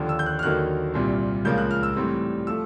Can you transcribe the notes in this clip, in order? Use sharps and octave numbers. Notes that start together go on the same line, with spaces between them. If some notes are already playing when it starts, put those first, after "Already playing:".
Already playing: D#2 D3 F3
E6
G6
F#6
F6
D#2 D3 F#3 A#3 D#4 F#6
C2 A#2 G3 C4
C#2 C#3 F3 A#3 G6
F#6
F6
E6
A2 E3 G3 C4
F3 A3 E6